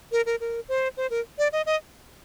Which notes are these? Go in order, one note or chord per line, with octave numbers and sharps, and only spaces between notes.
A#4
A#4
A#4
C5
C5
A#4
D5
D#5
D#5